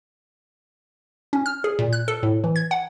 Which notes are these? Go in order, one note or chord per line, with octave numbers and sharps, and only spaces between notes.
C#4
F6
G#4
A#2
F#6
A4
A2
E3
G#6
F#5